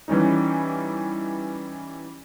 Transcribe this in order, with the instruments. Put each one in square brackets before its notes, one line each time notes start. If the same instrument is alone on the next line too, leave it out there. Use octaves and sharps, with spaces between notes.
[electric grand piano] E3 G3 C#4 D#4